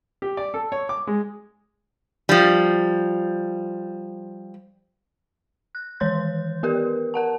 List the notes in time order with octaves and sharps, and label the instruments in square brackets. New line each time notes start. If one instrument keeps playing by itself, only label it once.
[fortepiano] G4
D5
A4
C#5
D6
G#3
[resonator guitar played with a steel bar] F3 G3
[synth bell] F#6
D#3 E3 C#5 C6 G6
B3 G4 A#4 B4
A#4 F#5 A5